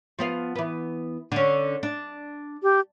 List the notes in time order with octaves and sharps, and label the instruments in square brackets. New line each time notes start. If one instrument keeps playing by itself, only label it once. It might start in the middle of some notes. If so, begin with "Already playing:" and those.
[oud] F3 B3 F5
E3 B3
D3 C#4
D4
[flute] G4